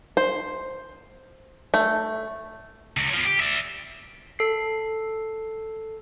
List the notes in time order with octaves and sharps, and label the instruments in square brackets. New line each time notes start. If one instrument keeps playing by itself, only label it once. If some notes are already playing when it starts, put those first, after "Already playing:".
[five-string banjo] C5
A3
[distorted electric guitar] C#2
F3 B3
G4
D5 E5
[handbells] A4 C7